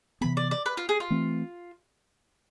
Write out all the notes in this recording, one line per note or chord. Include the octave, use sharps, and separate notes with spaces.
C3 E3 B3 B5
D5
D5
B4
F4
G#4
F4
E3 A3 C4